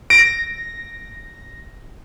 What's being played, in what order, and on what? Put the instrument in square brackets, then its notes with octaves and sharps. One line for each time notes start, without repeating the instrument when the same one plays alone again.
[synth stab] A#6 [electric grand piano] D7